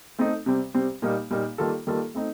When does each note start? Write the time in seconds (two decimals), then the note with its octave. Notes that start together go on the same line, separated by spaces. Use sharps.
0.19 A3 C4 D#4 A4
0.46 C3 G3 C4
0.74 C3 G3 C4
1.02 A#2 G3 A#3 D#4
1.30 A#2 G3 A#3 D#4
1.58 D#3 G3 A#3 F4 A4
1.87 D#3 G3 A#3 F4 A4
2.15 A3 C4 D#4